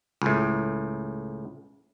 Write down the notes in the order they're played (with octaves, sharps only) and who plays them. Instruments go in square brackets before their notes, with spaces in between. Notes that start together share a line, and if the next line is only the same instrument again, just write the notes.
[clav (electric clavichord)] C#2 A2